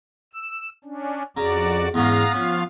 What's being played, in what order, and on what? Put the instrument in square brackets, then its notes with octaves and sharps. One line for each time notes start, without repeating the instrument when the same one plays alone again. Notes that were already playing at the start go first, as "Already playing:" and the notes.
[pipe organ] E6
C#4 D4
[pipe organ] F2 F#4 D5 [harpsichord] C#3 [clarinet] A#5
[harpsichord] E2 G#2 C#4 [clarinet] B3 [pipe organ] F5 A#5
[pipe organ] F3 F4 F5 [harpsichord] C#4